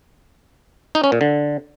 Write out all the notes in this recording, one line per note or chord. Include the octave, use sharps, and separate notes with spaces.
D#4
C#4
A#2
D3